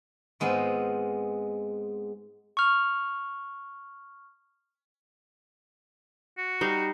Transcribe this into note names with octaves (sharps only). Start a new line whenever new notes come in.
G#2 G#3 B3 C4 F4
C#6 F6
F#4
G3 D#4 F5